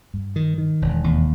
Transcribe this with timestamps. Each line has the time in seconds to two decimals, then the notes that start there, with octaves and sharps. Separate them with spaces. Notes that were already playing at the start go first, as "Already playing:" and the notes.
0.14 G2
0.36 D#3
0.58 D#3
0.82 E1
1.04 D#2